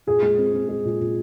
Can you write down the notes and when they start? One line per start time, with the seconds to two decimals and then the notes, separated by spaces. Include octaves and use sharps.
0.07 A#2 G#4
0.22 G#3
0.38 C4
0.54 C4
0.69 G#3
0.85 A#2
1.00 A#2